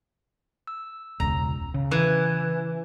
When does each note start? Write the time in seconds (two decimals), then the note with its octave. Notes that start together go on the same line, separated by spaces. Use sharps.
0.67 E6
1.20 E1 C#2 A#5
1.74 C#3
1.91 E3 B4 F#6 G#6